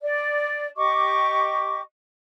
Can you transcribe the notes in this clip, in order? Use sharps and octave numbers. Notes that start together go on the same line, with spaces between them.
D5
G4 D#5 C#6 D6